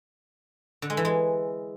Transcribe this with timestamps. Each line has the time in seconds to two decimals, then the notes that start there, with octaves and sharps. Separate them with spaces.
0.82 D3
0.90 G#3
0.97 E3
1.05 G#3